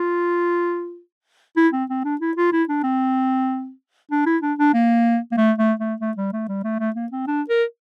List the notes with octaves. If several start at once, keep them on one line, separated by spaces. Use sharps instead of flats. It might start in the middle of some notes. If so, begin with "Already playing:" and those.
Already playing: F4
E4
C4
C4
D4
E4
F4
E4
D4
C4
D4
E4
D4
D4
A#3
A#3
A3
A3
A3
A3
G3
A3
G3
A3
A3
A#3
C4
D4
A#4